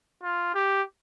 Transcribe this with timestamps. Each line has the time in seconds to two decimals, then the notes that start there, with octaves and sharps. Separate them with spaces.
0.23 F4
0.54 G4